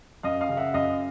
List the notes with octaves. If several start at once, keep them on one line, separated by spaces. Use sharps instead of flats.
F#2 D#5 F5
D#5 F5
C#3
E5 F#5
F#2 D#5 F5